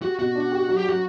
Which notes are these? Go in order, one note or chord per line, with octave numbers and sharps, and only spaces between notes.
F#4 G4
B2 F#4
D4
G4
F#3
G4
F#3 F#4